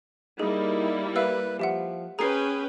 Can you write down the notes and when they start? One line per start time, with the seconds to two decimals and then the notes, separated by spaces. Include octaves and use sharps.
0.40 G3 A#3 D#4 E4 G#4
1.16 B4 E5 F5 E6
1.59 F3 G4 E5 F#5
2.19 C#4 G#4 B4 G5 A#5 C7